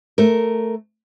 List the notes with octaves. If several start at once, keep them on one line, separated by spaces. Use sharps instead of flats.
A3 A#4